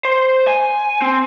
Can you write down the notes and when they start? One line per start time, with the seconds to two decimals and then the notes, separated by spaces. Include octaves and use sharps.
0.05 C5
0.48 G#5
1.02 C4